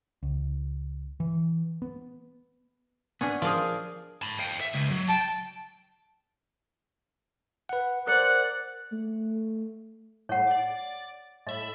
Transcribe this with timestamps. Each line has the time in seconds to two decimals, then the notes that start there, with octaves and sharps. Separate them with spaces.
0.23 C#2
1.20 E3
1.82 B3
3.21 B3 C#4 D4 G#4
3.42 F3 G#4 A#4 D5
4.22 A5 B5
4.40 F5 G5
4.61 E5
4.74 C#2
4.91 F#3
5.10 G5 A5
7.69 B4 F#5
8.07 A#4 C5 D5 F#5 F#6
8.92 A3
10.29 A2 C#5 F#5
10.47 D5 D6
11.47 A2 D#5 E5 B5